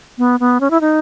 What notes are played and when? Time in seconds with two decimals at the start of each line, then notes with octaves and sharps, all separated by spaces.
0.18 B3
0.40 B3
0.61 C#4
0.71 E4
0.81 D#4